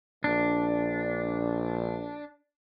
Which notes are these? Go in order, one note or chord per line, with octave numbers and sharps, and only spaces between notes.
A#1 D4